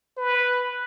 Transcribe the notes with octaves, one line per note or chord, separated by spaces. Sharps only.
B4